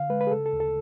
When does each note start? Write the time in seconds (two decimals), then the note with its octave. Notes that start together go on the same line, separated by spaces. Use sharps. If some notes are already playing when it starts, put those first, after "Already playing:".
Already playing: D3 F5
0.10 G#3 B4
0.21 B4
0.27 G#4
0.31 C#3 A4
0.46 A4
0.53 D2
0.60 A4